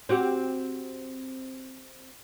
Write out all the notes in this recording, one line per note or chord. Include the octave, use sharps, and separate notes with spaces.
C4 F#4 G4